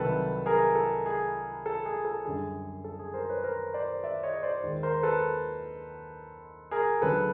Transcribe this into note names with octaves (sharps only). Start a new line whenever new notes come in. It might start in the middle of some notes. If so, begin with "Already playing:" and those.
Already playing: C2 C3 D#3 F#3 A4 B4
G#4 A#4
A4
G#4
A4
G#4
A4
F#2 D3 G3 G#4
A4
G#4
A#4 C5
B4 C#5
A#4 C5
C5 D5
D5 E5
C#5 D#5
C5 D5
D#2 D#3 G#3
A#4 C5
A4 B4
G#4 A#4
D2 C#3 F#3 A4 B4